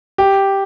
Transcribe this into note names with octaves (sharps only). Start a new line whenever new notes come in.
G4